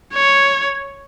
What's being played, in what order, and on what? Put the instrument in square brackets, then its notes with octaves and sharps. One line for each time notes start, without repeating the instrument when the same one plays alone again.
[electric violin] C#5